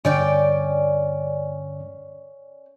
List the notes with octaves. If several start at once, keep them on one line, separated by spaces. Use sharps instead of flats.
G2 D3 C#4 D5 G5